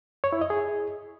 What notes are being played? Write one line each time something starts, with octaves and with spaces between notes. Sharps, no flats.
C#5
E4
D#5
G#4